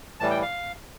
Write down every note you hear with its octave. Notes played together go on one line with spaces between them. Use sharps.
A2 E3 G3 A5
G5
F5